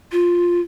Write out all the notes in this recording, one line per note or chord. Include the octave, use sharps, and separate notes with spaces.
F4